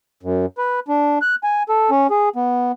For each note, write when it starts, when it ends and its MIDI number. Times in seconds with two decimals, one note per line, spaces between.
0.23 0.46 42
0.58 0.80 71
0.88 1.19 62
1.22 1.35 90
1.43 1.63 80
1.69 1.90 69
1.91 2.07 61
2.10 2.29 68
2.36 2.72 59